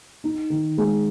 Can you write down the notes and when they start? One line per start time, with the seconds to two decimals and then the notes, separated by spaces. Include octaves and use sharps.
0.24 D#4
0.50 D#3
0.78 G#3